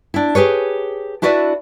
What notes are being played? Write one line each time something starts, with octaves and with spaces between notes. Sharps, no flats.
D4 E4
G4 G#4 B4 C#5
D4 E4 F#4 B4 D5 E5